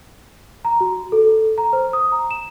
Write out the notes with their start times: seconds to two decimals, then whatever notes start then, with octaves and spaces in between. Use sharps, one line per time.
0.65 A#5
0.80 F#4
1.12 A4
1.58 A#5
1.73 C5
1.93 D#6
2.12 A#5
2.31 E7